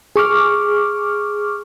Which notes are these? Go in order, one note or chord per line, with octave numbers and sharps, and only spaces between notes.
G#4 C#6 D6 F6